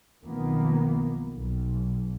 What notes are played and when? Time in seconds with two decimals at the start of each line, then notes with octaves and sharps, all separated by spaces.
0.23 B1 F2 D#3 A#3 B3
1.32 B1